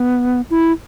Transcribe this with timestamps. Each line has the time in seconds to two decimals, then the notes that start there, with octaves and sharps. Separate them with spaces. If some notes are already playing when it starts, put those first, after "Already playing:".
Already playing: B3
0.50 E4